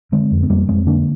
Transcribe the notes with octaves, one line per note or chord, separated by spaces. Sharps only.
D3 G#3 C4
F2
C4
F2 G3 A#3
F2 G#3 C4
D3 A#3 D4